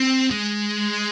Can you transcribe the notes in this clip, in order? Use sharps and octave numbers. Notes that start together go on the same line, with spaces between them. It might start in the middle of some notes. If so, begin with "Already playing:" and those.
Already playing: C4
G#3